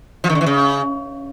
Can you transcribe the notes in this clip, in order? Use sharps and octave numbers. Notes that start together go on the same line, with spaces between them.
F3
D#3
D3
E3
C#3